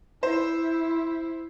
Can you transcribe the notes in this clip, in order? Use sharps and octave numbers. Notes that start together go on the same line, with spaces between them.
E4 C5